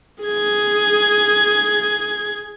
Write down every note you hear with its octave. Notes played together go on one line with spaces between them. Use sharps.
G#4 G#6